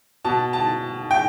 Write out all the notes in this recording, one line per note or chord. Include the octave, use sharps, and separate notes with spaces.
B2 A5
A5
G5